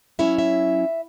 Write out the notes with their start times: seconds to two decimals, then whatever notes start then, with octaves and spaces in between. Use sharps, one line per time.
0.19 F#3 C#4 E4 E5
0.39 E5